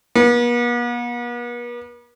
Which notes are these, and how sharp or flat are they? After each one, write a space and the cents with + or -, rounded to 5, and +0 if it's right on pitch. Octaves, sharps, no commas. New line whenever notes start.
B3 -45